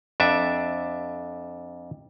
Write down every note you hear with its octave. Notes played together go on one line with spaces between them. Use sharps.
F2 D4 E5